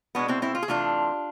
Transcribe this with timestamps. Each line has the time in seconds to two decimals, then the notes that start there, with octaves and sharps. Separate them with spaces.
0.15 B2 G#3 B3 D4
0.28 C4 E4
0.42 C4 E4
0.55 F4
0.62 G#4
0.68 C3 E3 A3 D4 F4